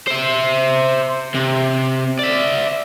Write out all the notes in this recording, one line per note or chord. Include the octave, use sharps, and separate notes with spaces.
C5 E5
C3
D5 E5